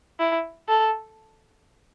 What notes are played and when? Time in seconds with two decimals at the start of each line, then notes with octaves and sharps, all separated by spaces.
0.20 E4
0.68 A4